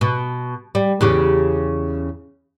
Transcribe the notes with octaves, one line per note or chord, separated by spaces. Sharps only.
B2
G3
E2 C#3 G4